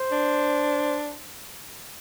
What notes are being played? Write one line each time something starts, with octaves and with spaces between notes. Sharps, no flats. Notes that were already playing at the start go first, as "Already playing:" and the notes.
Already playing: C5
D4